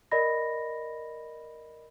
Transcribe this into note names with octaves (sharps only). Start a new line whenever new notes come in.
A#4 D5 D#5 B5 A#6